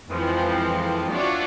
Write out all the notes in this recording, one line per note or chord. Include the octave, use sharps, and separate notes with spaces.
F2 E3 F3 G#3 C4
D4 F4 F#4 C#5 D5 E5